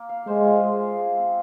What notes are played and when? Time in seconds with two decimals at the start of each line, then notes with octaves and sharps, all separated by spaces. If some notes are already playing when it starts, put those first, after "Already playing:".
Already playing: A#3
0.09 F5
0.27 G#3 C5
0.45 F4
0.63 G#3
0.81 F5
0.99 G#4
1.17 C4